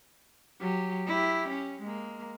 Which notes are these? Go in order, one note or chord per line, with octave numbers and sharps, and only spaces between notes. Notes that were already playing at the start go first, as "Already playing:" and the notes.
F#3 G4
E4 G4
C#4
G#3 A#3